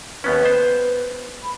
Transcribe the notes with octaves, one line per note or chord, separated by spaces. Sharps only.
D#2 B3 C#4 B4
B3 C5
B5